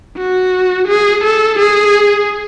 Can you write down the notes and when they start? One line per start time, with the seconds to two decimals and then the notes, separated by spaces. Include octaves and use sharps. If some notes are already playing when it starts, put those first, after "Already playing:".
0.17 F#4
0.88 G#4
1.24 A4
1.59 G#4